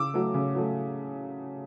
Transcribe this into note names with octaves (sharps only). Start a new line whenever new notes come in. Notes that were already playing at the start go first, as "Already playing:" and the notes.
Already playing: C#3 D6 E6
F#3 A3
C#3
F#3 A3